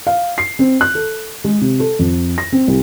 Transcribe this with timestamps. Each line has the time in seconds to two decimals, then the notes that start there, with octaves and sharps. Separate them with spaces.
0.07 F5
0.38 C7
0.59 C4
0.81 F#6
0.95 A4
1.44 G#3
1.61 C3
1.80 A4
1.99 F2
2.38 A#6
2.53 C4
2.68 C2